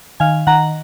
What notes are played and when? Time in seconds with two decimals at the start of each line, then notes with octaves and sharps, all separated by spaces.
0.20 D#3 F5 G#5
0.47 D#3 F#5 A#5